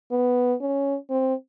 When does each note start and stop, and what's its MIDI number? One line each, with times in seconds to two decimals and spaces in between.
0.12 0.54 59
0.61 0.96 61
1.10 1.34 60